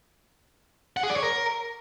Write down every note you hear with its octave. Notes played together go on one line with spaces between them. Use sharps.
F#5
G#4
D5
C#5
A#4